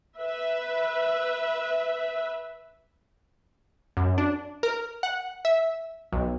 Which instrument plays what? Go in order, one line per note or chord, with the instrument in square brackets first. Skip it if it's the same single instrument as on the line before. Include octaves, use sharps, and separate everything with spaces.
[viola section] B4 E5
[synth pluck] F#2
D4
A#4
F#5
E5
B1